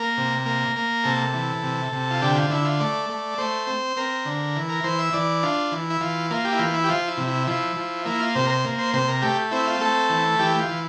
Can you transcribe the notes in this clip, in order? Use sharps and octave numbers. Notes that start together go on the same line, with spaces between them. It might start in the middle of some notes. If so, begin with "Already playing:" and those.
Already playing: A#3 A#4
C3
A#3
A#3
C3 A4
E3
C3
C3
F4
D3 G4
F4
D3 E4
F4
A3 D5
A3
A3 C5
C4
C4 A#4
D3
E3
A#4
E3 C5
E5
E3 D5
D4 F4
E3
E4
E3 F4
A#3 F4
G4
E4
E3 F4
E4
G4
F3 F4
E4
C3
E4
F3 E4
F3
A#3 E4
F4
C3 C5
A#4
C5
A#3
C5
C3 C5
A#4
A3 G4
C4 E4
F4
A3 A4
E3
E3 G4
F4
E3